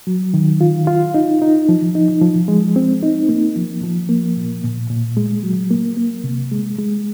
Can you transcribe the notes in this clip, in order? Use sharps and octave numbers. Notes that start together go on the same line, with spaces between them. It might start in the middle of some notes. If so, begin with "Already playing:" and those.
F#3
D#3
F4
F4
D#4
D#4
F3
D#4
F3
G#3
C4
D#4
A#3
F3
F3
A#3
A#2
A#2
A#2
G#3
F#3
A#3
A#3
C3
G#3
G#3